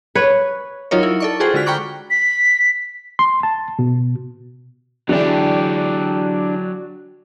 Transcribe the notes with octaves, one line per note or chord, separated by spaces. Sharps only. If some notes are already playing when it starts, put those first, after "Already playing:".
B4 C#5
F#3 D#4 F4 A#4 C#5
E4
A4 D5 C#6
F4 F#4 G#4 A4 C5 G5
D3 G#3 F#4 F6 B6
G5 A#5 B5 C#6 D6 F#6
B6
C6
A5
B2
D3 E3 F#3 G#3 D4 F#4 G4 D5